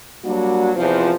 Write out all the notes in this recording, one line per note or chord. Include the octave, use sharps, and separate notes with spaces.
F#3 G3 A#3 D4 F#4
E2 C3 E3 F3